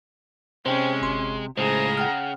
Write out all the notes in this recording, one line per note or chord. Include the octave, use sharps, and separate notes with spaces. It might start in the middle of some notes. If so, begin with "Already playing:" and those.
C3 G#3 C#4 C5 G5
G1 C6
C#2 A2 C#3 G#4 C5 A#5
F#5 G5 F6